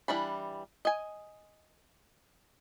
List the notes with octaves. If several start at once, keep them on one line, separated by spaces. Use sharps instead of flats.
E3 G3 D4 B5
D#5 G#5